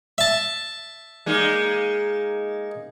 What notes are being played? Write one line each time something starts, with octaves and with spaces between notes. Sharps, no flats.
E5 A5
G#3 A#3 D#4